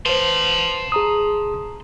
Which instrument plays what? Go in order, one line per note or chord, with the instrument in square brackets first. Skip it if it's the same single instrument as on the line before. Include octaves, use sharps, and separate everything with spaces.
[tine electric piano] B4 C5 [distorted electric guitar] A5 C6
[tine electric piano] G#4 A#5 D#6